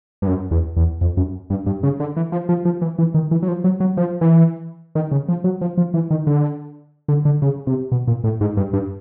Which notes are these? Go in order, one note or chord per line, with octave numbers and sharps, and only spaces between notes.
G2
F#2
E2
E2
F2
F#2
G2
G2
C#3
D3
E3
F3
F3
F3
E3
E3
D#3
E3
F#3
F3
F#3
F#3
F3
E3
D#3
C#3
F3
F#3
F3
F3
E3
D#3
D3
D3
D3
C#3
C3
B2
A#2
A2
G#2
G2
G2